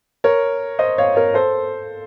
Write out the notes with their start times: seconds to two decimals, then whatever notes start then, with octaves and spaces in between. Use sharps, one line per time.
0.24 A#4 C#5
0.79 C5 D#5
0.98 C#5 F5
1.16 A#4 C#5
1.34 A4 C5